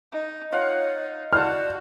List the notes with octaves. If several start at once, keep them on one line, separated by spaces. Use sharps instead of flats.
D#4
D#4 F4 C#5 F5 F#5
F#4 C5 D5 F#5 A5 F6